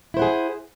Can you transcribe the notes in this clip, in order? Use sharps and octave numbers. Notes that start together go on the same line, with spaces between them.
E4 G#4 C5 F#5